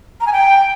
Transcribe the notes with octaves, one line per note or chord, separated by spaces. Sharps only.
A#5
G#5
G5